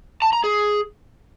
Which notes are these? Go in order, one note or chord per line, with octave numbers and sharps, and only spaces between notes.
A5
A#5
G#4